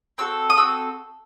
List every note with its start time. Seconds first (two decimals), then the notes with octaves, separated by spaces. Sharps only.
0.18 C4 F#4 A4 E6
0.50 D#6
0.57 C4 F#4 A4 E6